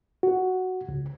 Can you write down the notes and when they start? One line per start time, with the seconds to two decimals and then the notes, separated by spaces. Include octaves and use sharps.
0.23 F#4
0.89 C#2